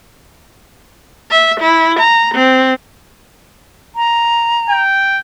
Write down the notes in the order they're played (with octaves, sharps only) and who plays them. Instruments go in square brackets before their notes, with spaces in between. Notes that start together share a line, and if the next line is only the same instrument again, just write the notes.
[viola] E5
E4
A#5
C4
[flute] A#5
[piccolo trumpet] G5